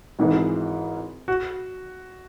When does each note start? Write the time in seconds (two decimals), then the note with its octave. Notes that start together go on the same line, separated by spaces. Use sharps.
0.19 G#1 G#2 E3 G#3
1.28 F#4